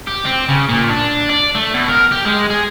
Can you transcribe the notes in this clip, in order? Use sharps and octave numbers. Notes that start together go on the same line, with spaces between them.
G4
C4
C#3
A#2
D4
D5
A3
B2
A#4
G4
G#3
G#4